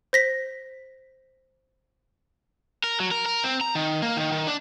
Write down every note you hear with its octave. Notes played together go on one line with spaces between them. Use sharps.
C5 A#6 B6
A#4
F#3
A#4
A#4
C4
A#5
D#3
A#3
D#3
D#3
D4